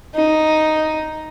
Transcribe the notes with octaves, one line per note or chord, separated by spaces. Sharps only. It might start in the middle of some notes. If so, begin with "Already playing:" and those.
D#4